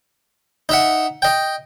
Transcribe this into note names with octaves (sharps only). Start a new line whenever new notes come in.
D#4 E5 F#5
D#5 G5